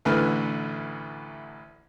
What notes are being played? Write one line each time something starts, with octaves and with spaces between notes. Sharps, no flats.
A1 D2 D3 E3 B4 F6